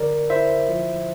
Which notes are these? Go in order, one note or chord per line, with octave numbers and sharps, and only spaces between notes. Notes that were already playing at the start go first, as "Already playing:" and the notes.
Already playing: D3 A#4 D5
E4 C5 E5
F3